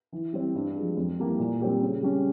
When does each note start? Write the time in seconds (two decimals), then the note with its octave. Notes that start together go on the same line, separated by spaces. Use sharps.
0.12 E3
0.33 G3 C4
0.55 G2
0.76 F3 G#3
0.97 F2
1.18 E3 G3 A#3
1.39 A#2
1.60 G3 C4 G4 A#4
1.81 C#3
2.02 G3 C#4